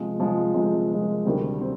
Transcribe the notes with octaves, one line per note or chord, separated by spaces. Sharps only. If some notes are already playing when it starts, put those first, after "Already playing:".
Already playing: C3 F3 G#3
C3 F3 G#3
C3 F3 G#3
C3 F3 G#3
D2 C3 D#3 G3 C4
C4